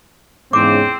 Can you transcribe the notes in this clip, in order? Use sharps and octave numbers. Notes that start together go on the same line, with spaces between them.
E2 G#2 C#3 C4 D6